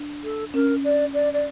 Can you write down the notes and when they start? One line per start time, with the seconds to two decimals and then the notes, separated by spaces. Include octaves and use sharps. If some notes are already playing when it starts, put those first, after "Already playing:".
Already playing: D4
0.23 A4
0.54 C#4 A#4
0.84 D5
1.14 D5
1.33 D5